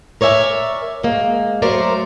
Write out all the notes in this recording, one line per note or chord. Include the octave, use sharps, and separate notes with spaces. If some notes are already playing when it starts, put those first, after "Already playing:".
A#4 C#5 D5 E5 G#5
G#3 A#3
F#3 A3 A#4 C5 D5